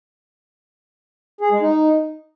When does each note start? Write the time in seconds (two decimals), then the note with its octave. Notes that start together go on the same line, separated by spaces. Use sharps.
1.41 G#4
1.51 G#3
1.61 D#4